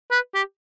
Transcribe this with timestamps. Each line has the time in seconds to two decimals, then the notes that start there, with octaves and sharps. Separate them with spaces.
0.11 B4
0.34 G4